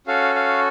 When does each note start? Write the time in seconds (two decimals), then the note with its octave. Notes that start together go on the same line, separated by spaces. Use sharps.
0.07 C#4 F#4 A4 F5
0.35 F5